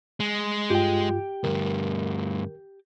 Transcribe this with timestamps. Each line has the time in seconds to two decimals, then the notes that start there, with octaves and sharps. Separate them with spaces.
0.20 G#3
0.70 G2 F4 G4 G5
1.44 D2 G2 A#4